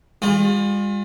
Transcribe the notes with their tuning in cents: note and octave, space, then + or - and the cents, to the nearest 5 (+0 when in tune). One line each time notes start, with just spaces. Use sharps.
G#3 -45 F4 +35